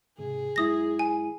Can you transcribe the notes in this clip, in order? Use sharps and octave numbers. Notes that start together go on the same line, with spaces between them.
G#2 C3 G#4
F#2 G#3 E4 D#6 A#6
G#5